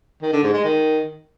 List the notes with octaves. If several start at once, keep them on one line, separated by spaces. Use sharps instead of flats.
D#3
D3
G#2
G#3
D#3